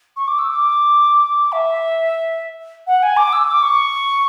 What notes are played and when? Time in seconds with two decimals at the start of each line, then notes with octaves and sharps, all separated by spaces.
0.16 C#6
0.28 D6
0.39 E6
0.50 D6
1.52 E5
2.87 F#5
3.03 G#5
3.17 D6
3.33 E6
3.47 D6
3.62 C#6